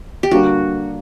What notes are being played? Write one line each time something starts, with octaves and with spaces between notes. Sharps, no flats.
G4
D3 G3 A#3 D4 F#4